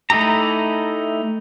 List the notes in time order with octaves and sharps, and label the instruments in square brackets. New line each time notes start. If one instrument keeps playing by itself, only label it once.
[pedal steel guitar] A3 D#4 E4 G4 A#5